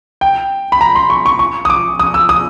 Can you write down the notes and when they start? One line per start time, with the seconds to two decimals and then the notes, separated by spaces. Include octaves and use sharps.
0.21 G5
0.72 B5
0.81 A#5
0.95 C6
1.10 C#6
1.26 C#6
1.39 C#6
1.65 D#6
1.70 D6
1.99 D#6
2.14 E6
2.29 D#6